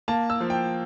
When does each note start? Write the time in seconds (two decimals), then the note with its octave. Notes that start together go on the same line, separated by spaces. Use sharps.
0.08 A#3 A5
0.30 E6
0.41 F3
0.50 G5